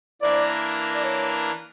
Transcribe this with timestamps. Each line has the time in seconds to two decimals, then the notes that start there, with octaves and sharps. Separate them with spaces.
0.22 E3 A#3 D4 A#4 D5
0.94 D5
1.03 C#5